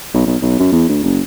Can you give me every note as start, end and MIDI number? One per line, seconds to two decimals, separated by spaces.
0.14 0.21 35
0.26 0.36 35
0.42 0.57 35
0.59 0.68 42
0.72 0.84 40
0.89 1.03 38
1.03 1.21 30